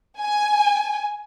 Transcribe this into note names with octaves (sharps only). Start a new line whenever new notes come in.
G#5